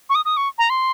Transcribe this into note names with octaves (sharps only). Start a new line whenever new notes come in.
C#6
D#6
D#6
C#6
A#5
C6